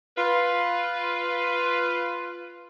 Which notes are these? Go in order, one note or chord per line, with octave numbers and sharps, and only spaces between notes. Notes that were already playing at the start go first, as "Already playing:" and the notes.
F4 B4